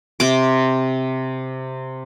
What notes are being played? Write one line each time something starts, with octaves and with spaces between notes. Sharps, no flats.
C3 D6